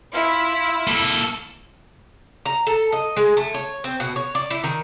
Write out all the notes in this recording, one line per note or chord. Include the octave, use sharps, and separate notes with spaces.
E4 F4
A#3 A4
A#5
A4
D#5
G#3
A3
C#5
C4
B2
C#5
D5
E4
D#3